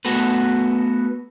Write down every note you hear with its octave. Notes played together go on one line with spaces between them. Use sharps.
A3 B3 F#4 A4 B4